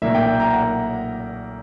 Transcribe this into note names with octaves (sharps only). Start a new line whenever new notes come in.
B1 A#2 A#3 E5
G5
G5
A#5
F#5